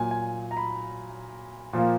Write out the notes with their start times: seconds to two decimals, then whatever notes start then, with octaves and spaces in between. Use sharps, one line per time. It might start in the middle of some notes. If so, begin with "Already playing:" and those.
Already playing: A#2 F#3 A#3 G#5
0.11 G#5
0.51 A#5
0.57 B5
1.73 A#2 F3 A#3